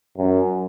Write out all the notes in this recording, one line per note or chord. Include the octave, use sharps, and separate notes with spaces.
F#2